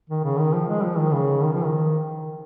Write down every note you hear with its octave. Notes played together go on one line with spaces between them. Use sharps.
D#3
C#3
D#3
F3
G#3
F3
D#3
C#3
D#3
F3
D#3